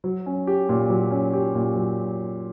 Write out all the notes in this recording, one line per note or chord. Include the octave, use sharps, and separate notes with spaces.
F#3
C#4
G4
A#2
F#3
C#4
G4
A#2
F#3